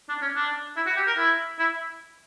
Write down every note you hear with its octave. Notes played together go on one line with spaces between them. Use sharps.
D4
C#4
D4
E4
F#4
G4
A#4
E4
E4